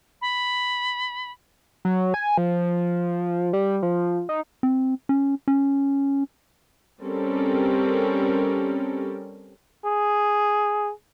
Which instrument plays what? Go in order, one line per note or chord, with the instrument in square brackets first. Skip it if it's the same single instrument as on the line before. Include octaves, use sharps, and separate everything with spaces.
[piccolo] B5
[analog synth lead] F#3
G#5
F3
G3
F3
D#4
[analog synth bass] C4
C#4
C#4
[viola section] G3 C4 C#4 A4 A#4
[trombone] G#4